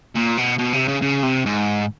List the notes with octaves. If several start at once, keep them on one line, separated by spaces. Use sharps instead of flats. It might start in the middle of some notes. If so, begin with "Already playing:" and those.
A#2
B2
B2
C3
C#3
C#3
C3
G#2